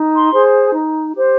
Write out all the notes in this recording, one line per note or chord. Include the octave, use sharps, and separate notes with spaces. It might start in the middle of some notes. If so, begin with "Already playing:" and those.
Already playing: D#4
C6
G#4 C5
D#4
G4 C5